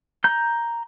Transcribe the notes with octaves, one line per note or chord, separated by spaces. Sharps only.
A#5 G6